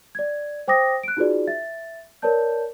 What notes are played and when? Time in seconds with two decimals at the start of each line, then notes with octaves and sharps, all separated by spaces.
0.15 D5 G#6
0.68 C5 G5 D6 D#6 A#6
1.03 F#6 D7
1.17 D#4 F4 F#4 G#4 B4 D5
1.47 E5 A6
2.22 A#4 B4 C#5 D5 A5 G6